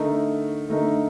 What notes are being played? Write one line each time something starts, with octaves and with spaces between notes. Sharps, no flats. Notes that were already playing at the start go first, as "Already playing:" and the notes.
Already playing: D3 A3 D#4 A#4
D3 A3 D#4 A#4